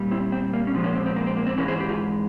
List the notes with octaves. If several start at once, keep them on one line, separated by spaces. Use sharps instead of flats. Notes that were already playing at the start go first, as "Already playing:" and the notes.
Already playing: A#2 G3
C4 E4
C4
A#3
C#4
A#2 F3 G#3 C4
A#3 C#4
C4
C4
A#3
C4
A#3
C4
G#2 E3 G#3 A#3 C#4
G#4 C5
G4
F4 G#4